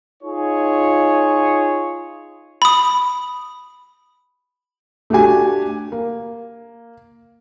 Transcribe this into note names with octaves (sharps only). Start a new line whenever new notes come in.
D#4 F4 G#4 C#5
B5 D#6
A3 D4 F#4 G4 G#5
A#3